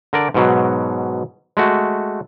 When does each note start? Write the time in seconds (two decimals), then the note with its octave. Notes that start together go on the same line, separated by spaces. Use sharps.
0.13 D3 A#4 D5
0.34 G#2 B2 F#3
1.57 G#3 A3 F#4